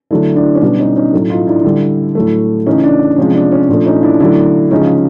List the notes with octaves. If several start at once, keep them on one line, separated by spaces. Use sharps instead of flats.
D3 F#3 A3 D4 E4
D4 E4
C#4
B2 G3 D4
C#4 D#4
C#4 D#4
A2 F#3 A3
D#4 F4
D4 E4
D3 G3
A2 F#3 A3
C#3 E3 A3 C#4 D#4
D4
C3 F3 G#3 C#4
D4
C#4
A#2 F3 A3 D4
C#4 D#4
D4 E4
D3 F#3 A3 D4 E4
C#3 F3 G#3 C#4 D#4